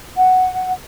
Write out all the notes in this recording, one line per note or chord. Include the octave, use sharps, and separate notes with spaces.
F#5